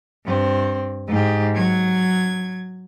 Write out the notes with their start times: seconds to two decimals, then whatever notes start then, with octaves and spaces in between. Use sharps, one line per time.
0.24 G2 C4
1.07 G#2 G4
1.54 F#3 G#6